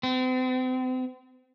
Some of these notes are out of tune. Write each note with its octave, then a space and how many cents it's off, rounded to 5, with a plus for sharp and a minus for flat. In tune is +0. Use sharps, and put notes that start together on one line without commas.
C4 -40